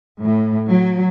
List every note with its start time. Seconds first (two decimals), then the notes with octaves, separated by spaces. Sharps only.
0.21 A2
0.70 F#3